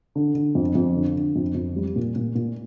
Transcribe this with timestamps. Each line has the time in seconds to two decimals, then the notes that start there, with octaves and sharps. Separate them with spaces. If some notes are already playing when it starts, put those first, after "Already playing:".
0.15 D3
0.35 D3
0.55 F2
0.75 F2
0.95 D3
1.16 D3
1.36 F2
1.55 F2
1.76 G3
1.96 A#2
2.16 A#2
2.35 A#2